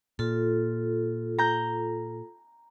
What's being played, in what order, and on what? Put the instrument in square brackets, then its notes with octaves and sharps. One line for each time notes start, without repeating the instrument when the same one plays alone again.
[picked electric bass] A#2 [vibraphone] F4 A4
[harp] A#5 G6